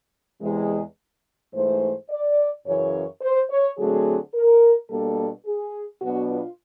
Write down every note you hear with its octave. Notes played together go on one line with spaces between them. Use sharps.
E2 C3 E3 G#3
G#2 E3 A3 C5
D5
F#2 C#3 E3 C#5
C5
C#5
D3 F#3 A3 C4 G#4
A#4
B2 G3 A#3 D4 A4
G#4
B2 F#3 B3 D4 F#4
F4